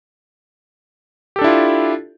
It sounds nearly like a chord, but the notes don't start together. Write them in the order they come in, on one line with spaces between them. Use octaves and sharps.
G4 A4 D4 E4 F4